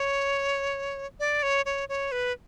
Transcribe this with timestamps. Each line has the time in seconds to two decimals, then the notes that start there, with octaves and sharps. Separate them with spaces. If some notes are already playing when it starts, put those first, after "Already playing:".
Already playing: C#5
1.20 D5
1.43 C#5
1.66 C#5
1.89 C#5
2.12 B4